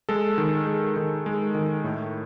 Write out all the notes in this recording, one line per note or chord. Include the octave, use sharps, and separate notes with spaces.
G#3 A4
D#3
G#3
D#3
G#3
D#3
A2